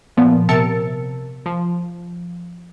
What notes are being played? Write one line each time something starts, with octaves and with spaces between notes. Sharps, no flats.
A#2 F3 B3
C3 A#4 A5 E6 A6 C#7
F3